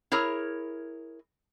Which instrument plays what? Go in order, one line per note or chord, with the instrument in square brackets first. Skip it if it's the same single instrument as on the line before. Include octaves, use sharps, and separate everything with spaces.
[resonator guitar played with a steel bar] E4 G#4 A#4 C#5